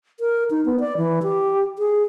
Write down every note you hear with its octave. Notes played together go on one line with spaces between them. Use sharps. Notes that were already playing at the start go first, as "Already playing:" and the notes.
A#4
D#4
B3
D5
E3
G4
G#4